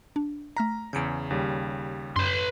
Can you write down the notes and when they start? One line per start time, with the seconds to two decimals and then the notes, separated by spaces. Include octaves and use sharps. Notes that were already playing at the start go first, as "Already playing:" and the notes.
0.16 D4
0.57 A3 A#5 F6 B6
0.93 E2 C#3 G6 C#7 D7
1.30 D#2 C#3 G3
2.16 F#2 B4 C6